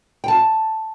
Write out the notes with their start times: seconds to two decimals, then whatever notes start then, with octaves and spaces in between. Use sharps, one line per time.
0.24 G5 A5